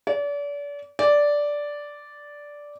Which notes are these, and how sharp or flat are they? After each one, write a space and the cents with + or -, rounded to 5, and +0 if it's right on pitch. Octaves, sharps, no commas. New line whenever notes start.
D5 -35
D5 -5